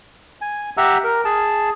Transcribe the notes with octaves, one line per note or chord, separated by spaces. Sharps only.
G#5
G4 E5 F#5 A#5 E6
A#4
G#4 A5